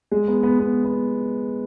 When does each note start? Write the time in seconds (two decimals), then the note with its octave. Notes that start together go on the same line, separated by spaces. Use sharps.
0.11 G#3
0.28 B3
0.43 B3
0.59 B3
0.84 B3